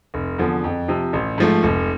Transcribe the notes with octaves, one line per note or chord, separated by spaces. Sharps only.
F1
E2 D3 F3
F2
C3 F3
A1
G#2 F3 A3
F1